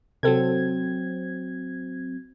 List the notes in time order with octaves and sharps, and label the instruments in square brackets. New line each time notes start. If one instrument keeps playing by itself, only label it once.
[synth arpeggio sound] C3 A4 [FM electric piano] F#3 C4 G#6